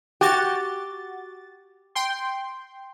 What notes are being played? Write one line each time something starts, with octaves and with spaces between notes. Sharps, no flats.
F#4 G4 A6
G5 C6